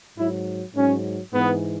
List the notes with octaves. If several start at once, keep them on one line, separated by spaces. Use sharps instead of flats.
G#2 F#3 E4
G#2 F#3 C#4
G#2 E3 B3